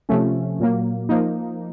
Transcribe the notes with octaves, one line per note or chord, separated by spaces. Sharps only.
C3 F3 A3 C#4
A#2 F#3 A#3
F3 A#3 D#4